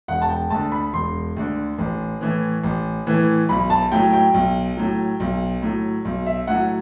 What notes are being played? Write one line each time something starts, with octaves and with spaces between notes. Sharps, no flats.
E1 F#5
A5
G5
D2 D3 A5
B5
E1 C6
D2 D3
A1
A2 E3
A1
A2 E3
B1 B5
A5
A2 F#3 G5
G5
B1
A2 F#3
B1
A2 F#3
B1
E5
A2 F#3 F#5